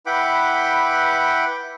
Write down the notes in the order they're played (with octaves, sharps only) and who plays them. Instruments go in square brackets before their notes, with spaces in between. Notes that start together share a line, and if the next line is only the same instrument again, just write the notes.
[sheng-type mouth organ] E4 B4 F#5 G5 B5 D6